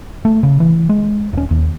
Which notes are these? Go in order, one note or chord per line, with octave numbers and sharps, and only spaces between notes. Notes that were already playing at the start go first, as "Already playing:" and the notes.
A3
C#3
E3
G#3
D#1 C#4
D#2